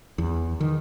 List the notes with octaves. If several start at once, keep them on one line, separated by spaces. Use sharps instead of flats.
E2
D#3